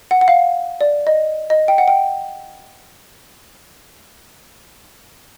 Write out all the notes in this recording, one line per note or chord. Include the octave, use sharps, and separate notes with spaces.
F#5
F#5
F5
D5
D#5
D#5
G5
F#5
G5